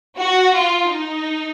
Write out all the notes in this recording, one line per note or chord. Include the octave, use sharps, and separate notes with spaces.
F#4
F4
D#4